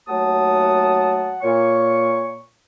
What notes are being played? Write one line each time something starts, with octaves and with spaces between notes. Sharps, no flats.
D#2 F#3 A3 F#5 A5 D#6
A#2 C#5 C#6